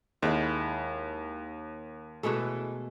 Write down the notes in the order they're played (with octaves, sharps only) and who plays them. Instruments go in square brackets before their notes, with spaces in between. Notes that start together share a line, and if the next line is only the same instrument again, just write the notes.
[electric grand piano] D#2 [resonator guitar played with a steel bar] G#3 E4
[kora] B2 G#3 A3 [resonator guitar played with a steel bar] E3 A4